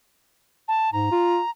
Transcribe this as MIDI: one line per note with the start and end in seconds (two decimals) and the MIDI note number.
0.68 0.90 81
0.93 1.09 44
0.93 1.50 82
1.11 1.39 65